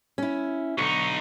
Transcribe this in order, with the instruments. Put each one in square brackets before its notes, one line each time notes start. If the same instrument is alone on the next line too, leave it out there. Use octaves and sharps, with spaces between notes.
[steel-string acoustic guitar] C#4 E4
[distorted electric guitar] B1 D#4 [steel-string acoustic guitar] D3 [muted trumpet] C#6